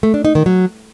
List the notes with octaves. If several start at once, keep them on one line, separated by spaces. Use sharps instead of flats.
A3
D4
D#4
D#3
F#3